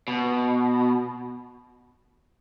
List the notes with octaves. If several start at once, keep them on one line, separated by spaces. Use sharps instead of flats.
B2